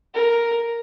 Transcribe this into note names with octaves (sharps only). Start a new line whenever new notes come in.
A#4